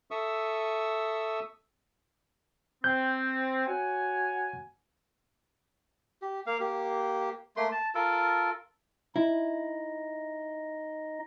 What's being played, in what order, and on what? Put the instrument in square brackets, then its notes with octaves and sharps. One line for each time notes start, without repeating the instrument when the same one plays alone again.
[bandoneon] A4 E5 C#6 D#6 E6
[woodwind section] C4 [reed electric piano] G6
[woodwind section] F#4 C#5 G#5
[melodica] G4
A#3 F5
A#3 G4
A3 A#3 C6
A5
F4 A4 A#4
[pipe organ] D#4 D#5 [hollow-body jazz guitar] E4